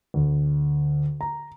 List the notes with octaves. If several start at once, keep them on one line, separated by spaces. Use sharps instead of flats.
D2
A#5